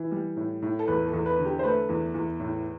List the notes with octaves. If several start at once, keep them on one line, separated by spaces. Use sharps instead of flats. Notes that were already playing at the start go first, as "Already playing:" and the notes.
Already playing: E3
G3
A2
A2
A4
E2 B4
A4
E2
B4
D3
G4
C5
A3 B4
E2
E2
A2